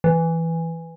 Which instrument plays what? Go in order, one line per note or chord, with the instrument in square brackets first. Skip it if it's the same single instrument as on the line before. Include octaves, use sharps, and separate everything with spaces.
[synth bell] E3